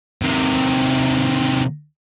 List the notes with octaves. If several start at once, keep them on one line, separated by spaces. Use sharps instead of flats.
C3 D#3